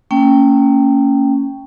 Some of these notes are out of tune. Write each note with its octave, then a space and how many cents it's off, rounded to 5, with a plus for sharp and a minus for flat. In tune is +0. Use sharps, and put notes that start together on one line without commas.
A#3 -35 C#4 +0 G5 +0